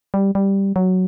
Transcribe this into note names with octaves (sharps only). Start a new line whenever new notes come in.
G3
G3
F#3